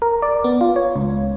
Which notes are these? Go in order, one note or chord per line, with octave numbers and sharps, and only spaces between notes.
A#4
D5
B3
F4
C#5
C#2